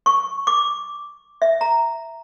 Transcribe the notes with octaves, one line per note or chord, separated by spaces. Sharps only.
C#6
D6
E5
A#5